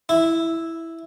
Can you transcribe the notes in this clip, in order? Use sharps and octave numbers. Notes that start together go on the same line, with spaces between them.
E4